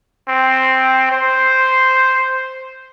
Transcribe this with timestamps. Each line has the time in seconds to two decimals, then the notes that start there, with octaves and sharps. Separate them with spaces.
0.28 C4
1.12 C5